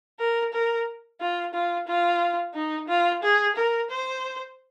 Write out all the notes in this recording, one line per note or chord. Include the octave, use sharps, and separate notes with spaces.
A#4
A#4
F4
F4
F4
D#4
F4
G#4
A#4
C5